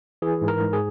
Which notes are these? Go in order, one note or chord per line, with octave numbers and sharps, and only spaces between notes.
E3 G#4
G#2
A#4
G#2
G#4